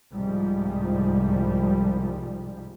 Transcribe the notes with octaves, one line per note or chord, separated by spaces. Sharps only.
C2 G#2 F3 G3